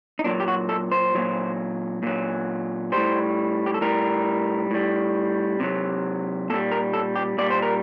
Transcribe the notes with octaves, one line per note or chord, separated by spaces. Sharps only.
D#4
A#2 F#3 D4
G4
F#4
A4
C5
A#2 F#3
A#2 F#3
A2 G3 C5
G4
A4
A2 G3 A#4
A2 G3
C3 F#3
A#2 G3 A4
A#4
A4
G4
A#2 G3 D5
C5
A#4